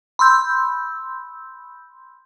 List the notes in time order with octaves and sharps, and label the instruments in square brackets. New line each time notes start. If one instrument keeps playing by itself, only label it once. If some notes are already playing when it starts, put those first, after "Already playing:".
[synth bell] B5 C6 E6 G6